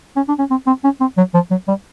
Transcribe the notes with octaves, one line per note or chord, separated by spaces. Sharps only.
C#4
D4
C#4
C4
C4
C#4
C4
F#3
F3
F#3
G3